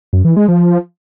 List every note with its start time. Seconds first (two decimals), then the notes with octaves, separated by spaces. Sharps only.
0.13 F#2
0.25 E3
0.36 G#3
0.48 F3